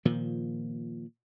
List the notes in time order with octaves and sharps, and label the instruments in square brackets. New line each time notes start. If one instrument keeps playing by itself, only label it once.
[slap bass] A#2 D#3 F3